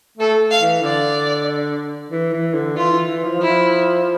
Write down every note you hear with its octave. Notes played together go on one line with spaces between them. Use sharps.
A3 A4
F5
E3
D3 D5
E3
E3
D3
E3 F4
E3
E3
F3
F3 E4